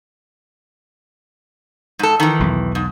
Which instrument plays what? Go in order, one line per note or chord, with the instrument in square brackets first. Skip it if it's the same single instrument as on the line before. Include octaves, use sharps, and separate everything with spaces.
[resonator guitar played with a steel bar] G#2 A4
D#3 E3
[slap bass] B1 E2
[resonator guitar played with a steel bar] G#2